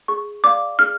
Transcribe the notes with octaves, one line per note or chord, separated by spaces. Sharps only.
G#4 C#6
D5 F5 D6
G#4 F6